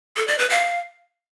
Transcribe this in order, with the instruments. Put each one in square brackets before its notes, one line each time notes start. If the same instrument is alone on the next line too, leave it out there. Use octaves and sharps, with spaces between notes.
[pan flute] A4
D5
B4
F5